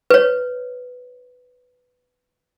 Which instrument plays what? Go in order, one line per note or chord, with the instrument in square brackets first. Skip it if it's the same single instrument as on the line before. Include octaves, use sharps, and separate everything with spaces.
[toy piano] B4 C#5